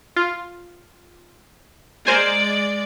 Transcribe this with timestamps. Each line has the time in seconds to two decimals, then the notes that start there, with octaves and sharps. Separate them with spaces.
0.16 F4
2.07 G#3 A#4 C5 D5 G#5